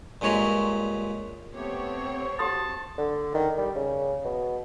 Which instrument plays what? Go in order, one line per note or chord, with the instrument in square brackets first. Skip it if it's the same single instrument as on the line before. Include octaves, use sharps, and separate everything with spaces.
[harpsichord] G2 A#2 G#3 C#5 A#5 C6
[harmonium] A3 B3 G4 [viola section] C4 C#5
[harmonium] F#4 [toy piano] G4 C6 D#6 [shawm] A5
[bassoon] D3
D#3
G3
C#3
B2